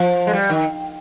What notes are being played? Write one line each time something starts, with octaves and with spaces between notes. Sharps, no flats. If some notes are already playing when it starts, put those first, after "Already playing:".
Already playing: F3
G#3
G3
D#3